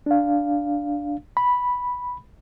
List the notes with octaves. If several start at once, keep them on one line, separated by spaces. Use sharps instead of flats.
D4 F5
B5